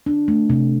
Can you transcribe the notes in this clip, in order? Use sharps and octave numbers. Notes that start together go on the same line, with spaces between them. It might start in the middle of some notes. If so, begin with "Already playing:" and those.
D4
A3
C3